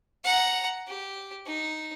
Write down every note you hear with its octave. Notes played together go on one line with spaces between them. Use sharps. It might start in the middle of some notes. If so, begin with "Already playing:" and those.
F#5 A#5
G4
D#4